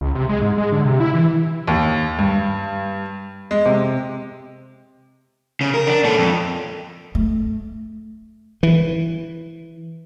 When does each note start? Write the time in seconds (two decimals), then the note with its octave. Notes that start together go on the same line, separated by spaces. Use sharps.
0.01 C#2
0.15 C3
0.29 G#3
0.42 G#2
0.58 G#3
0.72 D3
0.85 C3
1.00 E4
1.14 E3
1.67 D#2
2.19 G2
3.51 G#3
3.66 C3
5.61 C#3
5.74 A#4
5.87 D4
6.04 A#2 A4
6.18 F2
7.15 A3
8.63 E3